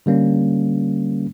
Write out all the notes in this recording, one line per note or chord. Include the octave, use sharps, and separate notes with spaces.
D3 G3 A#3 C#4